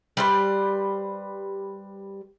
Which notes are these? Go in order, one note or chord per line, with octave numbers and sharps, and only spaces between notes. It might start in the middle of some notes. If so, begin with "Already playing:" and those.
G3 B4 C5